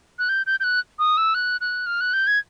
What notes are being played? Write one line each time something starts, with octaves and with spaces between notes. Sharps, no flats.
F#6
G6
G6
G6
F#6
D#6
E6
F#6
F#6
F6
F#6
G6
G#6